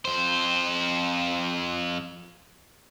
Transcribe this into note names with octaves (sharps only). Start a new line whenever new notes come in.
F2 C5